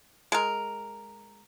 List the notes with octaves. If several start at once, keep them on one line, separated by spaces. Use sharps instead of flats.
G#3 A#4